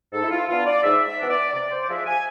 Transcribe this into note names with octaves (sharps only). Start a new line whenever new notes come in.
G#2 A4
E4
F4
E3 B3 D4 F4
D5
G#2 E5
E5
E3 B3 D4
D5
C3 D5
C5
D5
F3 G#3 E5
G#5